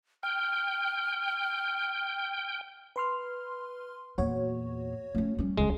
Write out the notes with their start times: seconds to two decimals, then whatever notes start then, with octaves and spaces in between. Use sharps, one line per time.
0.23 G5 F6
2.96 B4 C6 F6
4.18 E2 A#2 F#4 C#5
5.15 A3 C#4
5.38 G3 C#4
5.58 D#1 C#2 D3 G#3